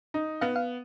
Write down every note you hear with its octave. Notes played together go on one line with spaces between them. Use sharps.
D#4
B3 F5
F5